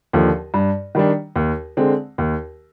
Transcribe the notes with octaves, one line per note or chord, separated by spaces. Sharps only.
D#2 D3 F3
G2
D#3 G3 D4
D#2
D3 G#3 C4
D#2